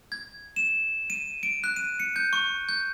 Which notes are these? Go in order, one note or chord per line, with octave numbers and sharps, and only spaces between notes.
G#6
E7
D#7
D7
F#6
D#7
C#7
G6
C#6
G6